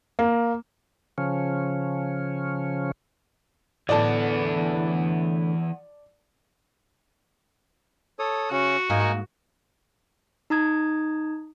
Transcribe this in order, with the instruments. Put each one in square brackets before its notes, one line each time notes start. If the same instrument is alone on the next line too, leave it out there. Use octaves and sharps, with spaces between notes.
[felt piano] A#3
[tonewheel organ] C#3 F3 C#4
[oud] A2 D3 D#5 [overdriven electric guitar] E3 B3 [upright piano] D5 A5
[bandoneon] A4 C#5 D#6
[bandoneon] C#3 C#4 [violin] F#4
[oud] G#2 A#3 F4 [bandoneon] D#4 A#4 G#5
[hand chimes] D#4 A#5 D#6 G#6